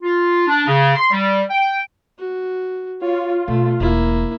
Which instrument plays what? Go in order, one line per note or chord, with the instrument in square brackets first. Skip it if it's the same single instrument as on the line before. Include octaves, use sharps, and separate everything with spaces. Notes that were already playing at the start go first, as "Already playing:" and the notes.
[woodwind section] F4
D4
C#3
C6
G3
G5
[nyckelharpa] F#4
[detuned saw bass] F4 [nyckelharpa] C#5
[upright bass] B2 [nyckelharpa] A3
[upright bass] E1 [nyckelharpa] A#3 E4